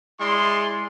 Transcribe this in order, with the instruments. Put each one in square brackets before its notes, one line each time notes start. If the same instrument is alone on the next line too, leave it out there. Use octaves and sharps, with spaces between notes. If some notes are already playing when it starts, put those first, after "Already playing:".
[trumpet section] G#3 E4 D5 C6